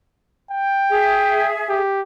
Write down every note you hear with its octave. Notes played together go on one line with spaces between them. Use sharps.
G5
G#4 E5
G4